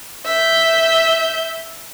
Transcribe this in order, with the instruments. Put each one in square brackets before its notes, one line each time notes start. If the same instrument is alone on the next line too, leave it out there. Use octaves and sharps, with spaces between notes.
[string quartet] E5 G6